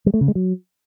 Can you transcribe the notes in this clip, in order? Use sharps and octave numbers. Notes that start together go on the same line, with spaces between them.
G3
A3
C#3
G#3
F#3